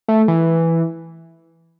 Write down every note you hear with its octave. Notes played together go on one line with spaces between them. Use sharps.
A3
E3